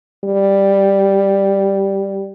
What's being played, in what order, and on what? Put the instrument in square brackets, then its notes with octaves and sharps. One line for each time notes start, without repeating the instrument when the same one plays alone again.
[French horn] G3